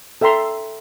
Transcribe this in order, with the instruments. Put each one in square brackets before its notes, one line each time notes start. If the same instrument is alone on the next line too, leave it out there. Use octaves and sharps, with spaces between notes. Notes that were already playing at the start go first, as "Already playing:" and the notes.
[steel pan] A4 E5 G5 A#5 C6